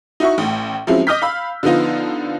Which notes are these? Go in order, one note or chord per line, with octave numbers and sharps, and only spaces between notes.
D#4 E4 F#4 E5 C#6
A1 A2
F3 F#3 G#3 C4 C#4 E4
D#5 D6 D#6 F6 G6 B6
F5 B5 E6
D3 F3 B3 D#4 F4